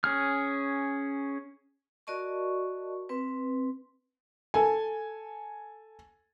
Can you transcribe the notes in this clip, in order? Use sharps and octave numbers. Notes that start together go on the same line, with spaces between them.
C#4 G#4 F6
F#4 A#4 D5 D#5 A5 C#6
C4 B4
A4 G#5